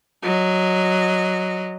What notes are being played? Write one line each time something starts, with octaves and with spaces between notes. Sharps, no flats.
F#3 D#5